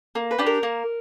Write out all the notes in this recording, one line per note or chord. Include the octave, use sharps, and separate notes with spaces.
A#3
B4
D4 G4
A#4
A#3